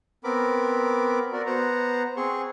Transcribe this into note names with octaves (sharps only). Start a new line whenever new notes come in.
B3 C4 A#4 B5 D6
F#4 A#4 D5
B3 C5 F#5 A#5
C4 G#4 C6 C#6